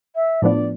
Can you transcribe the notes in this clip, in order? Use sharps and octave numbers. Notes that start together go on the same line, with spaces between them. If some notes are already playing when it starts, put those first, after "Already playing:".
E5
A2 F3 B3 D4 D5